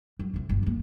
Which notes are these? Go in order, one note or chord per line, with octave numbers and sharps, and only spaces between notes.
F#2
D2 C3
G1
D#3 A#3